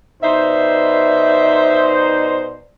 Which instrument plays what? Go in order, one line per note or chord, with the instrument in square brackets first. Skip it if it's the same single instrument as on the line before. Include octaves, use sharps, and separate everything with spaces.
[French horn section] B2 B4 D5 [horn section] D#4 C5 [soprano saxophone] E5